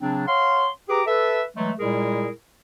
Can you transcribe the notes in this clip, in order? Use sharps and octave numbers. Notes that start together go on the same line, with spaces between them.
C#3 F#3 C4 D4
C#5 F5 F#5 C6
G4 G#4 B4 A#5 D6
A4 B4 E5
E3 F#3 G#3 A3
A#2 G3 G#3 E4 G#4 A#4